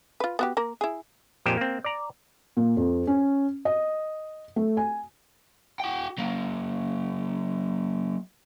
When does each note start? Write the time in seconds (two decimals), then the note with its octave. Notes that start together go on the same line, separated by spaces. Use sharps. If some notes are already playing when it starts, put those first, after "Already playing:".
0.20 F4 B4
0.39 B3 F#4 G4
0.57 A#3 A#4
0.81 E4 G#4
1.46 A#1 F2 A#2 G4 C5 G#5
1.57 A#3 C4
1.84 D5 A#5
2.57 A#2
2.77 F2
3.07 C#4
3.65 D#5
4.56 A3
4.77 G#5
5.80 F#4 G5
6.19 F#3 A#3